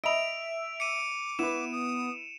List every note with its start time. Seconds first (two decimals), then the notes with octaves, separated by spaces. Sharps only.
0.04 D#5 E5 B5 D7 F7
0.80 D6 C#7 D#7
1.39 B3 E4 B4 E7
1.72 D#6